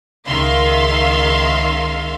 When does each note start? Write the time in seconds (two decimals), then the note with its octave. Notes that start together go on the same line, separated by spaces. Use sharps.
0.27 C#2 D#3 E5 F5 C6